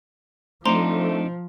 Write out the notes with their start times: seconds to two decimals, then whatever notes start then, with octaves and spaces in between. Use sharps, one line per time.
0.66 F3 A3 C4 D4 D#4 C5 A#5 C6